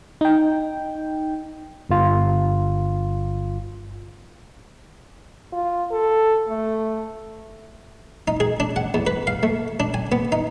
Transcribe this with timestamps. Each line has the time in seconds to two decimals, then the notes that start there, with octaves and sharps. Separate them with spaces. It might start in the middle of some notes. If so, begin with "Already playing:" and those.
0.21 D#4 G5
1.89 G1 F4
5.52 F4
5.91 A4
6.49 A3
8.28 D#4
8.40 G#4
8.60 D4
8.76 F#5
8.94 E2
9.07 B4
9.27 F5
9.43 A3
9.80 D4
9.94 G#5
10.12 B3
10.32 D#4